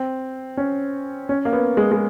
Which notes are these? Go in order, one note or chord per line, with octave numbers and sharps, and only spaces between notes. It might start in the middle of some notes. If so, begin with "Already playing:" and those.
Already playing: C4
C#4
C#4
A#3
B3
G#3
G#3